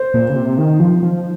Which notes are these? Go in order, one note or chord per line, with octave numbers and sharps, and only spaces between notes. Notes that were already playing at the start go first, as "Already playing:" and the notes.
Already playing: C5
A#2
C#3
C3
D#3
F3
F3